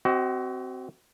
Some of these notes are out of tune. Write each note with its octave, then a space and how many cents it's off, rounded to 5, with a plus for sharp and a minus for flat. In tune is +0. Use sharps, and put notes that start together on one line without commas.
C4 -10 F#4 +30 D#5 +0